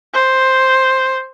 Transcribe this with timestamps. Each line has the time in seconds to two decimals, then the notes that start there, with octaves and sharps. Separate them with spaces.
0.14 C5